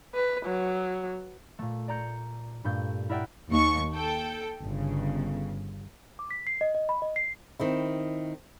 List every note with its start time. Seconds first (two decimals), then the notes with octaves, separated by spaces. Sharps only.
0.15 B4
0.46 F#3
1.59 A#2 A3
1.88 D5 A#5 G6 C#7
2.64 G2 A#2 A3 G6
3.09 E4 A#4 D5 E5 F#5 G5
3.50 D#2 C#6
3.94 A4 G5
4.62 G1 C#3
6.19 D6
6.31 B6
6.47 C7
6.61 D#5
6.75 D#5
6.89 B5
7.02 D#5
7.16 C7
7.60 D#3 C4 E4